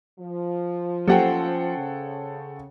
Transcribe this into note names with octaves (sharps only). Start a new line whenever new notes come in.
F3
F#3 A#3 C#4 G4 A4 C5 F#5 G5
C#3